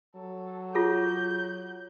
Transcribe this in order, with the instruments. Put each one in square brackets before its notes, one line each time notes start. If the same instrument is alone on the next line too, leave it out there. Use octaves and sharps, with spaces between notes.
[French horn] F#3 [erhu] A4
[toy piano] F4 G#4 A4 [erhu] G6